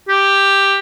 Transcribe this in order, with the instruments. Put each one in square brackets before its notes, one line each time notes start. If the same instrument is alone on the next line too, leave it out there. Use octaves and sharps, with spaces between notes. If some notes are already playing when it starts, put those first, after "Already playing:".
[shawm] G4